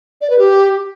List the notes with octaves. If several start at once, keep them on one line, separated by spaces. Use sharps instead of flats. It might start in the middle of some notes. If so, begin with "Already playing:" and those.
D5
B4
G4